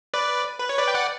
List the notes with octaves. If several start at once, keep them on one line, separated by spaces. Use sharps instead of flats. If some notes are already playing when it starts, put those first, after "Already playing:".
B4 D5
B4
C#5
B4 D5
G5
D5 F#5